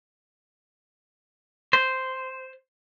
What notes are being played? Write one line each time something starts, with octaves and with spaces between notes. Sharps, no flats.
C5